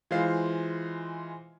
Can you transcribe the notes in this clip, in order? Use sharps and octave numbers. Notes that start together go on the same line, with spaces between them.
E3 G#3 F4 C5 F5 C7